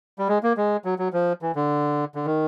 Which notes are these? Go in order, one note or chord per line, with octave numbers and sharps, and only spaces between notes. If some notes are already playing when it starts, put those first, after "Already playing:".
G3
G#3
A#3
G#3
F#3
F#3
F3
E3
D3
D3
D#3